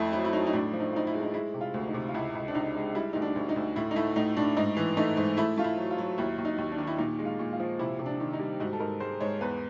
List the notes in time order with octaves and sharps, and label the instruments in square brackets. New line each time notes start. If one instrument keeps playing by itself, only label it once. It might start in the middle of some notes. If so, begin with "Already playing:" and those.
Already playing: [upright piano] F2 A3 E4
F#3 E4
E4
F#3 D#4
D#4
A2 D4
F3
D#4
F3 D#4
E4
G#3
D#4
G#3 E4
C3
F4
D2
D#4
C3
F4
C#2 E4
C#2
D4
C#2 D#4
G#3
G3 E4
D2 D#4
D4
D2
D#4
D2
A2 E4
D#4
A3 E4
A2 D#4
A2 D4
G#2 D#4
E3
A3 D#4
G#2
A3 E4
A3 F4
E4
F#3
F4
F#3
D#2 E4
D#2
D#4
D#2
D4
D#3
E4
A#2 D#4
G#3
F4
A#2
F4
F3
C3 E4
C3
D4
D#3
D#4
G3
G#2 F#4
A4
G#2 A#4
G#3 C5
G#2 C#5
E2 B4